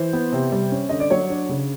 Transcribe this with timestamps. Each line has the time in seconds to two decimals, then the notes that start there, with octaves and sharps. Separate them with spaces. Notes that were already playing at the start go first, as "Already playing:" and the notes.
Already playing: E3 C5
0.13 B3
0.32 C3
0.52 G3
0.72 C#4
0.89 D3 D#5
1.00 D5
1.10 F#3 C#5
1.30 D4
1.49 C#3